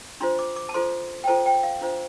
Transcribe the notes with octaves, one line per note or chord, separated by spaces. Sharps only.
D4 F4 C5 C6
D6
D6
A5
F4 A4 C5 C6
G5
F4 A4 C5 A5
G5
F5
D4 F4 C5